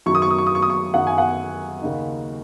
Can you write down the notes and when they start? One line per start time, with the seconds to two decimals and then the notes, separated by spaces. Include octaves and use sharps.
0.06 F#2 D#3 F#3 C#6
0.15 D#6
0.22 C#6
0.31 D#6
0.38 C#6
0.47 D#6
0.55 C#6
0.62 D#6
0.70 C#6
0.94 F#2 D#3 F#3 F#5
1.07 G#5
1.18 F#5
1.82 D#2 C#3 A#3 D#4